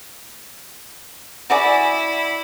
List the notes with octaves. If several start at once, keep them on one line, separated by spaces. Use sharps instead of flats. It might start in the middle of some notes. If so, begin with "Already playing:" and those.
E4 F#4 G#4 D5